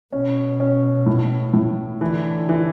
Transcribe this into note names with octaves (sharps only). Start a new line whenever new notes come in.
B2 C#4
C#4
A2
A2
D3 E3
E3